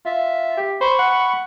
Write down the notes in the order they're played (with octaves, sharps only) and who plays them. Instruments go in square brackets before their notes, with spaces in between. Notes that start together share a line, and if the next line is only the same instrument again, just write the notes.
[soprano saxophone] F4 [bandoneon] E5
[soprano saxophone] G4
[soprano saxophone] C5 [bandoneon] B5 C#6
[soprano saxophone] F#5